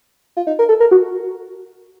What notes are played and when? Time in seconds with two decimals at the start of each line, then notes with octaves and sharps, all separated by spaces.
0.37 F4
0.47 D#4
0.59 A#4
0.69 A4
0.80 A#4
0.91 F#4